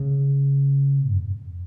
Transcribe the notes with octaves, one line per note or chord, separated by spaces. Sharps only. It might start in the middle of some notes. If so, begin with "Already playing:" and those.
Already playing: C#3
F2